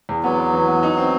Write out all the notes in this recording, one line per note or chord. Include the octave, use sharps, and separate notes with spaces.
E2
F#3 B3
B3
E3
B3
D#4
C4